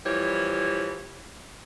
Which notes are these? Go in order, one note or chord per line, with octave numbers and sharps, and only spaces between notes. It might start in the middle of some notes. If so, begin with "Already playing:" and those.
E3 F3 G3 E4 C#5